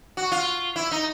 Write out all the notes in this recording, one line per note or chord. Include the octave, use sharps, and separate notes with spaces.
F#4
F4
E4
D#4